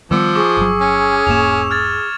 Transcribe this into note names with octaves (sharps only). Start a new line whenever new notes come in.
D#3 F3 G3 B3 D6 E6 C#7
G#4 C#6 D6
G1 F#3
C#4
E1 G#2 A#3 E7 F7
F6 G#6 A6